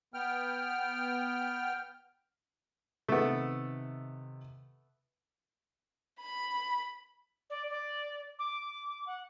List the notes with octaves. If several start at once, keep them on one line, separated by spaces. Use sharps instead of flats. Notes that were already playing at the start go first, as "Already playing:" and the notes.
B3 G5 F6
C3 D#3 A3 B3
B5
D5
D5
D6
F#5